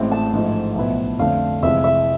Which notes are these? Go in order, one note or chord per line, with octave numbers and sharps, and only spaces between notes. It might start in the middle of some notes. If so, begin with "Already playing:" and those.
Already playing: A1 A2 G#3 C4
A5
A1 G#2 F3 A3
B1 A2 F3 B3 E4
F2 D3 A3 D4 F5
F1 F2 C3 E3 G#3 E5
E5